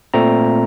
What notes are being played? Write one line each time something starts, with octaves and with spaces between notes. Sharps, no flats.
A#2 A3 C4 A#5